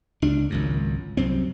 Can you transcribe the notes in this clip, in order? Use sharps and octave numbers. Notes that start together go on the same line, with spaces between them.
C#2 D4
G#1 C#2 F#2
C2 F#2 C4